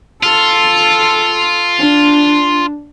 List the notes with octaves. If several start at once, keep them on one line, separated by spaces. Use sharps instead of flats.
F4 A4
D4